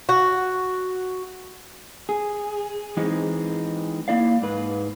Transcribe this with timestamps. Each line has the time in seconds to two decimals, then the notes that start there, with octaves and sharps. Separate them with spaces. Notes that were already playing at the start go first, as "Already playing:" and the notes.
0.09 F#4
2.09 G#4
2.97 E3 G#3 C4 D#4
4.08 A#3 E4 D5 F5
4.42 G#2 B4